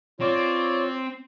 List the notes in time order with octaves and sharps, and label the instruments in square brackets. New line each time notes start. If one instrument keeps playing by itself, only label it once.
[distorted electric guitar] C4 [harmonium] F4 C#5 D5